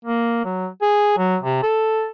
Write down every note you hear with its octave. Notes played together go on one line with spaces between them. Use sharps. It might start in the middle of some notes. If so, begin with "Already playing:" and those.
A#3
F#3
G#4
F#3
C3
A4